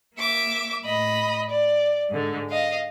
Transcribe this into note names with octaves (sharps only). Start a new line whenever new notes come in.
A#3 E5 D6
A2 D#5 B5
D5
G#2 D3
D#5 F5